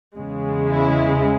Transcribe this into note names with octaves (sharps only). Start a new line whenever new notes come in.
E2 C#3 G#3
E4